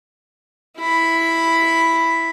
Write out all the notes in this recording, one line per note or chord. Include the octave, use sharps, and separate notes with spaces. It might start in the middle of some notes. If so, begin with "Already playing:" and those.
E4 B5